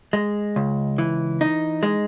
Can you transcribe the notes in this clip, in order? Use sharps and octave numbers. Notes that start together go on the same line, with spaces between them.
G#3
C#2
E3
D#4
G#3